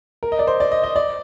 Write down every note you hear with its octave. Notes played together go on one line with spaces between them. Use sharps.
A#4
D#5
D5
C5
D5
D#5
D#5
D5